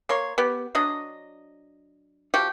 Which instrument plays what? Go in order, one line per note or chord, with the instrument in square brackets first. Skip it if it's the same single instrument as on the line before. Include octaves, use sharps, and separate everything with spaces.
[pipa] A#3 C#5 C6
B3 G4
F#3 D4 D#5
F3 F#4 G4